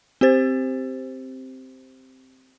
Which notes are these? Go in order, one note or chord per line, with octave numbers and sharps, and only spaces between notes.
C4 G4 C5 A6